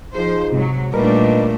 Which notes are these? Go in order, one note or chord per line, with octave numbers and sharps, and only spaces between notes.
F3 D#4 F4 G#4 C5
G#2 C3 F#3
A#2 G3 A3 D4 D#4 A#4 B4 D#5